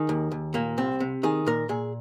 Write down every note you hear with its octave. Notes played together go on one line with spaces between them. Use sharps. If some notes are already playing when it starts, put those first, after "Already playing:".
Already playing: D#3 G#4
D#2
D#2
A#2 A#3
C2 C4
C3
D#3 G#4
A#2 A#4
A#2 G#4